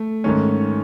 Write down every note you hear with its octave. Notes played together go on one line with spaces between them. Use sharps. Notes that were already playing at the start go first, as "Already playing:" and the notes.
Already playing: A3
G#2 D#3 A3 C#4